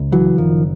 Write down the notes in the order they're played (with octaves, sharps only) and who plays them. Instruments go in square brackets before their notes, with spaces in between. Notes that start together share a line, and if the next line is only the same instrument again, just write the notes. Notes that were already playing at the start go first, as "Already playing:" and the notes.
Already playing: [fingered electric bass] C#2
C#3 E3 F#3
F#1 D#3 F3